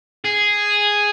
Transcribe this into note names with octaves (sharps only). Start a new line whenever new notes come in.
G#4